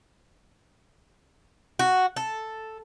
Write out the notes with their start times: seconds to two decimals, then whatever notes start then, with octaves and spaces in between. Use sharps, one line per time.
1.79 F#4
2.16 A4